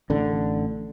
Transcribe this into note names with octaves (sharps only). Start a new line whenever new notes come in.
A1 D3